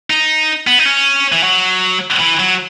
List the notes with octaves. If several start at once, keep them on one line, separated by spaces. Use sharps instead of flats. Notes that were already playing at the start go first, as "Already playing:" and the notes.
D#4
B3
D#4
C#4
E3
F#3
E3
F#3